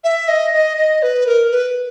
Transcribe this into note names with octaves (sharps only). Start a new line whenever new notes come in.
E5
D#5
D#5
D#5
B4
A#4
B4